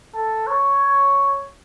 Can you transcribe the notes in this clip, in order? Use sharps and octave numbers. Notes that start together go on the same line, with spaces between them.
A4
C#5